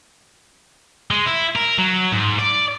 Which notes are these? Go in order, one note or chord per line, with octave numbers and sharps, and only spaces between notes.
G#3
E4
A#4
F#3
G#2
D5